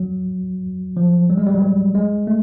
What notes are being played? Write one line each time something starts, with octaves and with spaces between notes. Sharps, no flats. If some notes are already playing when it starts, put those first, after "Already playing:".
Already playing: F#3
F3
G3
G#3
G3
F#3
G3
G#3
A3